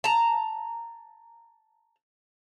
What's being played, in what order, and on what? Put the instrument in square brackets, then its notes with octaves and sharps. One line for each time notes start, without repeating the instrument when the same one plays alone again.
[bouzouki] A5 A#5